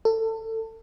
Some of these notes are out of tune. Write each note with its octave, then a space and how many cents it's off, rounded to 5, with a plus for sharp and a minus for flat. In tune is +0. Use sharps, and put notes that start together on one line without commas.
A4 +25